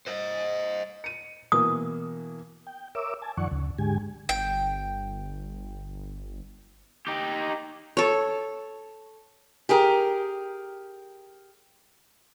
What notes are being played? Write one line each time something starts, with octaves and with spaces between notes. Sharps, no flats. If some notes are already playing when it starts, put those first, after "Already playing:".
C5 D#5
C#7 D#7
B2 E3 A#3 D#6
G5
A#4 C#5 E5 D6 E6
G#5 A5
F#2 D#3 F3 D5 F#5 C#6
D2 C#3
G#2 D3 G#3 G4 G#5
G1 G5
D#4 G4
A4 C#5
G4 G#4 A#4